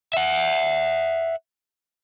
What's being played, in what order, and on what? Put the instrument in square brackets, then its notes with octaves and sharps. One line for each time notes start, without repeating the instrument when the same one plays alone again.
[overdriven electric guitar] E5 F#5